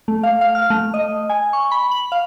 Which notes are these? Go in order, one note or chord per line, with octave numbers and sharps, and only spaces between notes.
A3
F5
F5
F6
A3
D#5
G#5
C#6
B5
F#7
F5